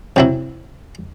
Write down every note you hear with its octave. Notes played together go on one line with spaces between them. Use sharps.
C3 F#3 E4